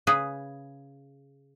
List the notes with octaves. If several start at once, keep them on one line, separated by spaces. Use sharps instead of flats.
C#3 G#4 B4